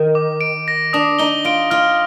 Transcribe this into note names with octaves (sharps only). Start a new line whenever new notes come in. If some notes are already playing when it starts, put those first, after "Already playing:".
Already playing: D#3
D6
D7
A#6
D4 D#6
D#4 G7
F4 D7
F4 F6